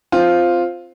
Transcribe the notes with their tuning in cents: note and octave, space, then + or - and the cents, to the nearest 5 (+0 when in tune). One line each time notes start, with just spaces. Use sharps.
C4 +0 F4 +0